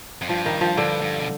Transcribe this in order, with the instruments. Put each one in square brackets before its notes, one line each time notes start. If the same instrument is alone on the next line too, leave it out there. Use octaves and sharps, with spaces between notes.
[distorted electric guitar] F2
[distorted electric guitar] G2 [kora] F3
[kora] D#3
F3
[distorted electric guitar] G2 [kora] D3
[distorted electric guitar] G2
B2